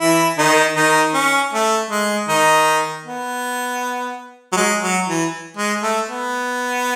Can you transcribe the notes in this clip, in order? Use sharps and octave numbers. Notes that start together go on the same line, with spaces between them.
E3 E4
D#3 D#4
D#3 D#4
C#4
A3
G#3
D#3 D#4
B3
F#3
G#3
F#3
E3
G#3
A3
B3